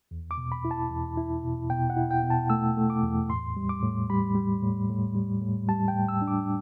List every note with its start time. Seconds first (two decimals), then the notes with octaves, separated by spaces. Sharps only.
0.11 E2
0.31 D6
0.37 B2
0.52 B5
0.65 E4
0.71 A5
0.91 E2
1.17 E4
1.44 B2
1.70 B2 G5
1.90 F#5
1.97 E4
2.11 G5
2.23 B2
2.30 A5
2.50 A3 E6
2.77 A3
2.90 D6
3.03 E2
3.29 A2 C6
3.56 G3
3.69 D6
3.83 A2
4.10 G3 B5
4.35 G3
4.63 A2
4.89 A2
5.15 G3
5.41 A2
5.68 G3 A5
5.88 G5
5.94 A2
6.09 E6
6.22 D4
6.28 D6